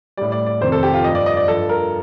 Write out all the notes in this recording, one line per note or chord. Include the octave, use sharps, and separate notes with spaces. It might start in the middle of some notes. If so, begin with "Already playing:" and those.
A2 G3 D5
D5
D5
F2 C3 D#3 C5
A4
G4
F4
G2 F3 D#5
D5
D#5
D5
G2 F3 A4
A#4